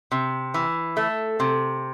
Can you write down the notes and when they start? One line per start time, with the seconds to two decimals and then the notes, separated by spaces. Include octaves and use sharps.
0.12 C3
0.54 E3
0.97 A3
1.40 C3